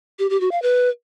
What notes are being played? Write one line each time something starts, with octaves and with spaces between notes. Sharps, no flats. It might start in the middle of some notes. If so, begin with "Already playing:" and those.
G4
G4
F#4
F5
B4